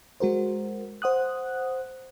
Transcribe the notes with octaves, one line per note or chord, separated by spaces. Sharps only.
G#3 F#4 A#4 C5
C5 F#5 D#6 F#6